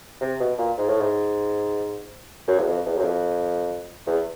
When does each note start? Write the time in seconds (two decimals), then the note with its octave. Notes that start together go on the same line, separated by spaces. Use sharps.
0.21 C3
0.40 B2
0.58 A#2
0.78 G#2
0.89 A2
1.00 G#2
2.48 F#2
2.59 E2
2.67 F2
2.86 E2
2.97 F#2
3.04 F2
4.07 E2